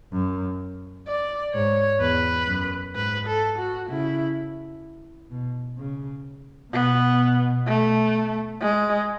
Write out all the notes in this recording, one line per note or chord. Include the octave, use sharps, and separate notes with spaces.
F#2
D5
G#2 C#5
E2 B4
F#2
G#2 B4
A4
F#4
C#3 E4
B2
C#3
B2 B3
A3
G#3